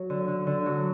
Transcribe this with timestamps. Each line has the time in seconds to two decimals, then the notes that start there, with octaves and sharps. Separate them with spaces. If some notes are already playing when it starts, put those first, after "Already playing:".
Already playing: F#3
0.10 D3
0.28 D3
0.47 D3
0.66 F#3